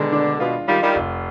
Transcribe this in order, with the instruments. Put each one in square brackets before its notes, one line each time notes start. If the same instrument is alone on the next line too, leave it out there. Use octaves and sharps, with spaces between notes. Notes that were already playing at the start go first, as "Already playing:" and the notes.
Already playing: [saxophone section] B2 D3 [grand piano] D#3 G#3
[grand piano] D4
[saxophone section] B2 [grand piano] F4
[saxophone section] D#3 G3 [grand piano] F4
[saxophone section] D#3 G3
[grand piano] F1